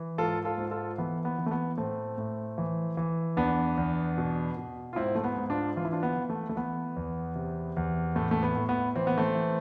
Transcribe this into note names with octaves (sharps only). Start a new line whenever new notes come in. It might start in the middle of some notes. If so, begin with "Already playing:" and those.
Already playing: E3
G#2 F4 A4
F4 A4
G#2
F4 A4
E3 B3
B3
E3
A3
B3
A2 A3 C4
A2
E3
E3
E2 B3 D4
E2
B2
B2
F4
G#2 C4 E4
A3
B3
G#2
D4 F4
E3 F4
E4
D4 F4
B3
E3
A3
A3
E3 B3
E2
C3
E2
A2 A3
A3
B3
A2
B3
E3 C4
B3
A3 C4
E3